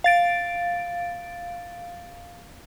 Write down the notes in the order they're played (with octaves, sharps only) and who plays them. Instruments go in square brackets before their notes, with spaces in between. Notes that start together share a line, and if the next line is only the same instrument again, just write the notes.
[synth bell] F5 A6 D7